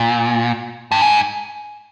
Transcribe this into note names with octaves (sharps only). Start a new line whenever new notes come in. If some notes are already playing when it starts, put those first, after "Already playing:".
Already playing: A#2
G2
G#2